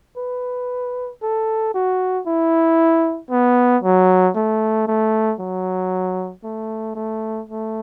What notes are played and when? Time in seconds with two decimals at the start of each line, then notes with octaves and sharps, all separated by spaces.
0.17 B4
1.23 A4
1.74 F#4
2.27 E4
3.31 B3
3.84 F#3
4.36 A3
4.88 A3
5.40 F#3
6.44 A3
6.96 A3
7.49 A3